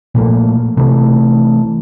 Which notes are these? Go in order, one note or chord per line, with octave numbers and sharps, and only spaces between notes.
A#2 F3 A3 A#3
C3 E3 A3